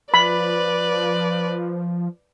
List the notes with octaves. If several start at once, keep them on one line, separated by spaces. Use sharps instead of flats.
F3 B4 D5 B5